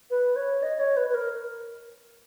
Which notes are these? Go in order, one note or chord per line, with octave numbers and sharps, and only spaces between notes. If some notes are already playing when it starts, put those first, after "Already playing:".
B4
C#5
D#5
C#5
B4
B4
A#4